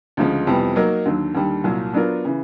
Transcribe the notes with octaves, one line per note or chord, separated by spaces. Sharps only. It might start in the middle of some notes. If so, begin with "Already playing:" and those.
D2 C#3 F3 G#3
F2 C3 E3 G3 B3
F#3 A#3 D#4 F#4 A#4
D#2 D3 F#3
D#2 D3 G3
C2 A#2 F#3
F#3 B3 D4 F4 A#4
C#3 E3